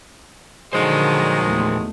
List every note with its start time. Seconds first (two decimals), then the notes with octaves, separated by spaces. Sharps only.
0.73 A#2 D3 D#3 F3 F#3 G#3 C5
1.44 E2 A3